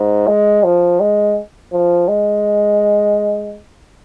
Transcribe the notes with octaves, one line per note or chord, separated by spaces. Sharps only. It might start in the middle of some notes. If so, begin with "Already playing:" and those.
Already playing: G#2
G#3
F3
G#3
F3
G#3